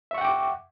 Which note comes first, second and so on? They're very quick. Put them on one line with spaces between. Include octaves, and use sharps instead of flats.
E5 C#6 F#5 G5 D6